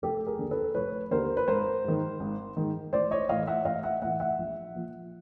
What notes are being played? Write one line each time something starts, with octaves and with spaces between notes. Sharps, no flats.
F1 G4 A4
G#4 A#4
D#2 D3
A4 B4
F1 B4 C#5
D#2 D3 A#4 C5
B4
G#1 A#4 C5
G#2 D#3
G#1
G#2 D#3
A1 C5 D5
C#5 D#5
A2 E3 D#5 F5
E5 F#5
A1 D#5 F5
E5 F#5
A2 E3 E5 F#5
E5 F#5
A#1
A#2 F3